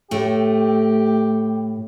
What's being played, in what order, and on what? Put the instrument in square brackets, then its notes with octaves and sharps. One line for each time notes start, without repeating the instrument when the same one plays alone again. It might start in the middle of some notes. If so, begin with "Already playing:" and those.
[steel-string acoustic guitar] A2 A3 [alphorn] G4